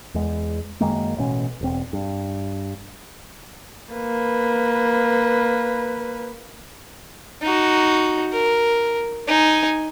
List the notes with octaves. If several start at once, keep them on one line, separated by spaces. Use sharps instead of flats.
E2 G#3
F#2 D#3 G#3 A#3
A1 B2 C#4
E1 C4
G2
A#3 B4
D#4 F#4
A#4
D#4 G#5